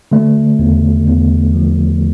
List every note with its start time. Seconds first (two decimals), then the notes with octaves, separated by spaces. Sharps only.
0.11 D3 A3
0.59 E2
1.07 E2
1.54 F3